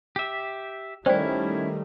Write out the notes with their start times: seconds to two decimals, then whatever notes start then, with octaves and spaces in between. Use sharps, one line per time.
0.16 G4 E5
1.06 D#3 G3 A3 C#4 E4 C5 D5 G5